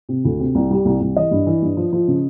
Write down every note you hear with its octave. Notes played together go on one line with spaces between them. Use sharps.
C3
D2
C3
C2
G3
C2
C2
E3 D#5
G2
E3
G2
F3
F3
C#3